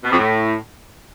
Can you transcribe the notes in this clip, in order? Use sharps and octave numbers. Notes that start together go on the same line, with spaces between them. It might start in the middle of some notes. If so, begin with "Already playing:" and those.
B2
F2
A2